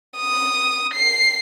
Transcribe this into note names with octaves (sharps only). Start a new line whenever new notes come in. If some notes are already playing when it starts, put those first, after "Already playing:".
D#6
C7